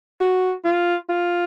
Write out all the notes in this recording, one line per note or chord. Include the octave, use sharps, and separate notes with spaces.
F#4
F4
F4